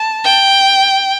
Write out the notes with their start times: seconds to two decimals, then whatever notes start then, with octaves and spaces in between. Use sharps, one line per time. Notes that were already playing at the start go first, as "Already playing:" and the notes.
Already playing: A5
0.24 G5